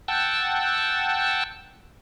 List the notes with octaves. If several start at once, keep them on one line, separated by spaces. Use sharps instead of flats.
F#5 G5 A5 E6